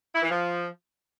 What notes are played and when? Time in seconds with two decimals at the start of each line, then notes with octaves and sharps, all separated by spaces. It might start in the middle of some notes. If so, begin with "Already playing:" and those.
0.14 E4
0.22 E3
0.30 F3